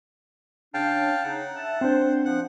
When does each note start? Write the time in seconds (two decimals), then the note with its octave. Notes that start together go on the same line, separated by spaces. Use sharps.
0.74 C#3 D4 F5 G5 A5
1.24 C#3 D#4 F#5
1.55 E5 A5
1.81 C4 D4 C5
2.25 F3 F#5